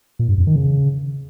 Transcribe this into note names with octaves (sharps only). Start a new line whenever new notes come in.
A#2
G2
F2
D#3
C#3